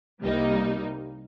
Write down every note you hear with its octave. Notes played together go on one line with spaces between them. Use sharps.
C2 C3 G3 A#3 D#4